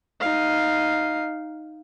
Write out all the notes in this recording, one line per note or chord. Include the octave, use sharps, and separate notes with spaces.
D#4 F5